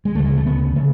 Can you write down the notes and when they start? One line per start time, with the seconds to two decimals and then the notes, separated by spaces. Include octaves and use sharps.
0.05 G#3
0.15 D2 A3
0.20 C#3
0.25 G#3
0.36 A3
0.46 D2 C#3 B3
0.76 C#3 A3